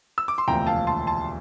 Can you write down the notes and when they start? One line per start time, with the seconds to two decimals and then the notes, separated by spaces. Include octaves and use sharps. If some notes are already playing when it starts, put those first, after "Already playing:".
0.18 E6
0.28 D6
0.38 C6
0.48 E1 D2 C3 F3 A#3 G5 A#5
0.67 F5 A5
0.87 A5 C6
1.07 A5 C6